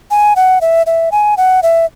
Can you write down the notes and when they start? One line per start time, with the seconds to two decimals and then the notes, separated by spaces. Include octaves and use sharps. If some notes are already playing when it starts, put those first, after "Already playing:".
0.11 G#5
0.36 F#5
0.61 E5
0.86 E5
1.12 G#5
1.37 F#5
1.63 E5